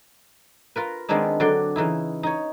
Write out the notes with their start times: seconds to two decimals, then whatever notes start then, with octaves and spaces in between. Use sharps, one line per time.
0.76 F4 A#4 B4
1.09 D#3 G#3 B3 C4 D4 D#4
1.40 D3 F#3 D5 G5 C6
1.76 C#3 E3 D#4 E4
2.23 D#4 C#5